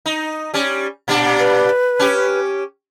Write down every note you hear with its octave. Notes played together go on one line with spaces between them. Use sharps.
D#4
G3 C#4
A#2 G3 D4
B4
C#4 G4